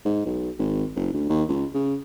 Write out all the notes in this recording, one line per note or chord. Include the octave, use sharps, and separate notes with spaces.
G#2
B1
G#1
F#1
D2
D#2
C#2
C#3